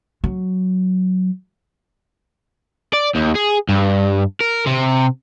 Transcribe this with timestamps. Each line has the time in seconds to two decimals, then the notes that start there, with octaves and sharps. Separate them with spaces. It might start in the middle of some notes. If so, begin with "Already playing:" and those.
0.24 F#3
2.94 D5
3.15 D#2
3.35 G#4
3.69 G2
4.41 A#4
4.67 C3